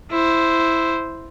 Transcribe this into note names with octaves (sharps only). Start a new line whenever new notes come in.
E4 C5